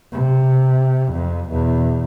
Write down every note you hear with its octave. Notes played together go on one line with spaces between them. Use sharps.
C3
F2
E2 B2